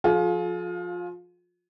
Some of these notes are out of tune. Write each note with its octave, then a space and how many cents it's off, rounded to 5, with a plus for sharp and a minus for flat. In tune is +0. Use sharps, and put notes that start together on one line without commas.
F3 +5 F4 +25 G#4 +40